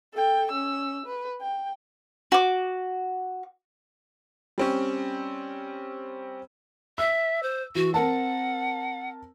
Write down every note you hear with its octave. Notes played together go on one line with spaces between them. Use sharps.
A4 G5
C#4 E6
B4
G5
F#4 D6
G3 C4 C#4
E5 E6
C5
E3 F#4
C4 A#4 F#5 A5